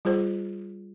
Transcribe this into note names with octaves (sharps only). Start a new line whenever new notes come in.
G3 F4 G#4 C5